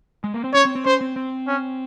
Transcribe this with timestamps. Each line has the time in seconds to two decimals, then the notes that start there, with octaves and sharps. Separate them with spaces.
0.24 G#3
0.34 A#3
0.44 C4
0.54 C#4 C#5
0.65 C4
0.75 C4
0.85 C#4 C5
1.01 C4
1.16 C4
1.47 C#4